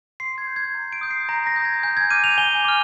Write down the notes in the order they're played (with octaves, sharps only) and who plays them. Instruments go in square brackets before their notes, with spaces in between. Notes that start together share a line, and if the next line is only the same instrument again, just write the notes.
[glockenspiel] C6 C7
G#6
G6
G#6
A#5
D7
D#6 G6
C7
A#5 A#6
A#6
D#6 G6
G#6
G#5 G6
G#6
D6 F6 D#7
F7
G#5 G7
D6 F6